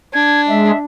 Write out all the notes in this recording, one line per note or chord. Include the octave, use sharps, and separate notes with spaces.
D4 G#6
G#3 E5